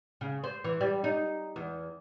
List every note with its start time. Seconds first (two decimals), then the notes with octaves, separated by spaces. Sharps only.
0.21 C#3
0.44 C5
0.64 E3
0.81 G3
1.04 D#4
1.56 E2